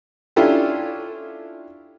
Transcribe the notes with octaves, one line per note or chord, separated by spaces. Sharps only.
C#4 D4 E4 F4 G4 A4